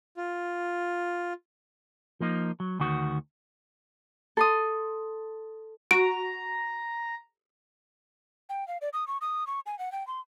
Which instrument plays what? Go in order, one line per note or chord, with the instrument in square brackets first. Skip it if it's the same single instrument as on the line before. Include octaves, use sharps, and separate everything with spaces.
[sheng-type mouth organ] F4
[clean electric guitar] F3 A#3 D#4
F#3
D2 D#3 F#4
[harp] A4 C6 D#6
[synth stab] F#4 [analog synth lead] A#5 [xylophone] D7
[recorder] G5
F5
D5
D#6
C#6
D#6
C#6
G#5
F#5
G5
C6